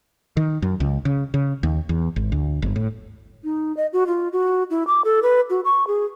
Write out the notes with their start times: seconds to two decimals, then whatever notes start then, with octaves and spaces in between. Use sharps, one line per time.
0.37 D#3
0.62 F#2
0.80 C#2
1.05 C#3
1.34 C#3
1.63 D#2
1.89 E2
2.16 G#1
2.32 D2
2.62 G1
2.76 A2
3.44 D#4
3.77 D#5
3.93 F#4
4.07 F4
4.32 F#4
4.70 E4
4.87 D6
5.05 A4
5.23 B4
5.50 F#4
5.65 C#6
5.87 G#4